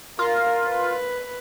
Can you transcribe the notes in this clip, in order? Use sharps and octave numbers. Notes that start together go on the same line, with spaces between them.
F4 A#4
B4